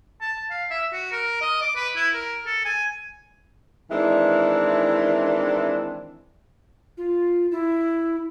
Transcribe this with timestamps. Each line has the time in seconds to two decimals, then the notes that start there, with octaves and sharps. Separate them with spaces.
0.21 A5
0.50 F5
0.70 E5
0.93 F#4
1.12 A#4
1.41 D#5
1.61 D6
1.76 B4
1.96 E4
2.14 A#4
2.46 A4
2.65 G#5
3.91 D#3 E3 G#3 C4 D4 E4
6.97 F4
7.51 E4